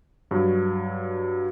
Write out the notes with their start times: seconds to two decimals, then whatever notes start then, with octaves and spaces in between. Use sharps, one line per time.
0.31 G2 F#3